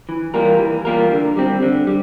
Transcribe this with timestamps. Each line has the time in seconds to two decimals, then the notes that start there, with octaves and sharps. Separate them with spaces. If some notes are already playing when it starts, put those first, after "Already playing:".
0.09 E3
0.34 G3 A#3 F4 A#4
0.59 E3
0.85 G3 A#3 F4 A#4
1.11 D3
1.37 G3 C4
1.62 D3
1.87 G3